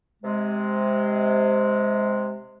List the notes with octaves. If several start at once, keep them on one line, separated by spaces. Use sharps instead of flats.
C3 G#3